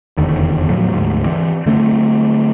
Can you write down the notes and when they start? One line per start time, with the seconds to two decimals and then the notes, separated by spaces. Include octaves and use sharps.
0.17 F1 E2 D3 D#3
0.69 A2 F3 F#3
0.94 D2 G#2
1.26 E3 C4
1.66 D3 A3 A#3 C4